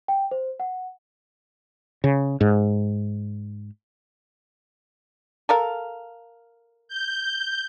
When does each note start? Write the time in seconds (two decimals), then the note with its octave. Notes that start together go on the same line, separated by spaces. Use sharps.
0.08 G5
0.31 C5
0.60 F#5
2.04 C#3
2.41 G#2
5.49 A4 A#4 F5
6.88 G6